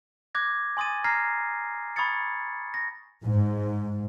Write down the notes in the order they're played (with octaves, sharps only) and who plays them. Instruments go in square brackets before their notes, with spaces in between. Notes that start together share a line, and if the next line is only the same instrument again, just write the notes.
[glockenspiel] D6 F#6 G#6 A#6
G#5 C6 D#6 A6 D#7
A#5 F6 G#6 A#6 C7
B5 C#6 D#6 G#6 A6 C#7
A#6
[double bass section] G#2